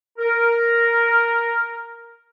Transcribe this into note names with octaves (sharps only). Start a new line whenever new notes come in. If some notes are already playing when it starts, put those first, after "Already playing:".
A#4